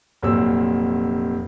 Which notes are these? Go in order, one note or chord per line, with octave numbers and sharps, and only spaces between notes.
F1 A#2 F#3 C4 E6